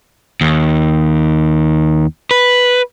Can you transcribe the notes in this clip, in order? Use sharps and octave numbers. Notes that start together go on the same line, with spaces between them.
D#2
B4